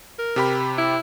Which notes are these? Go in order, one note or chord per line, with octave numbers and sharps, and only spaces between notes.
A#4
C3 G4 B5
E4